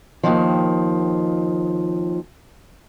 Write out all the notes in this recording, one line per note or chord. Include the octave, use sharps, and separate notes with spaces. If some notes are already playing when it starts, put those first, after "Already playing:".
D#2 A#2 D#3 F3